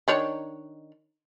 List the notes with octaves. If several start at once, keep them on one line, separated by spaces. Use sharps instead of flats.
D#3 D4 C#5